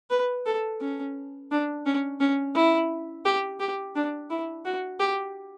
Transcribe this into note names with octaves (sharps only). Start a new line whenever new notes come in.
B4
A4
C#4
D4
C#4
C#4
E4
G4
G4
D4
E4
F#4
G4